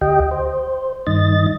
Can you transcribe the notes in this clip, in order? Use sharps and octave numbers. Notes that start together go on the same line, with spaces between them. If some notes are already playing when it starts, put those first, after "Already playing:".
D2 G4 D#5 G5
C5
G2 D#3 D#5 A6